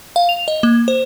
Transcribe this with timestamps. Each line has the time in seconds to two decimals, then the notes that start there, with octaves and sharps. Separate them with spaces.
0.16 F5
0.29 F7
0.48 D#5
0.63 A#3
0.88 C5